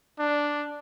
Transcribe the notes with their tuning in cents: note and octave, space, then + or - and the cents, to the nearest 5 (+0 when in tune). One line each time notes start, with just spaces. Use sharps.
D4 +0